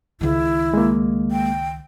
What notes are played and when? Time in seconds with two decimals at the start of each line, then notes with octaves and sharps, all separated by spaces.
0.21 C#2 D#3 E4
0.74 G#3 A#3
1.31 G5